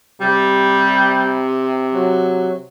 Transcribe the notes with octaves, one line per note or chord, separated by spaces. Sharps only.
C3 G3
F#3